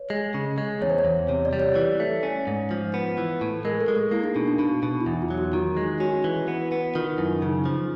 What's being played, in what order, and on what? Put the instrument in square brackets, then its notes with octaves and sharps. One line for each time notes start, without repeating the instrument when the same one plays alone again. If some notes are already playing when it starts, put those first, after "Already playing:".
Already playing: [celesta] B4 C#5
[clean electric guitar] G#3
C#3
G#3
[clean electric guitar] E2 [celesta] C#5
[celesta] C5
C#5
[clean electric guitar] E2
[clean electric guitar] C3 [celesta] C#5
[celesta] D5
[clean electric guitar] G3
[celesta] C#5
[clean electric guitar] E3
A3
C#4
G#2
F3
B3
E3
A2
[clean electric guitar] G#3 [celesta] A#4
[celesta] A4
[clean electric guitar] G#3
[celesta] G#4
[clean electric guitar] A#3 [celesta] E4
[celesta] D#4
[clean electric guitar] B2 [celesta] D4
[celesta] D4
[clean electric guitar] B2
B2
[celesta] E4
[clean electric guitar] E2 [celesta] D#4
[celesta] F4
[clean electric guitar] F#3
[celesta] F#4
[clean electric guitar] D#3 [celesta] F#4
[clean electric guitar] G#3
[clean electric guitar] C#4 [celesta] F#4
[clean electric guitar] E3
B3
B3
[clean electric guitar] D#3 [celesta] F4
[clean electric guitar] F#2 [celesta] E4
[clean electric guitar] C#3 [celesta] D#4
[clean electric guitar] F3